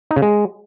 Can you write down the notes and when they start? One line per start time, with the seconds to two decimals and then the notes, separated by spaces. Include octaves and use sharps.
0.11 D#4
0.16 C#3
0.22 G#3